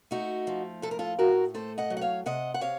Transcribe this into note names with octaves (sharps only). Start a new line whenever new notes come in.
A3 D#4 F#4
F3
A2 A4
A#4
F4 A4
A2 F#4 A#4
A3 A4 C5
D#5 F#5
F#3
F#5
C#5 F5
C3 D#5 F#5
F#5
C3 C#5 F5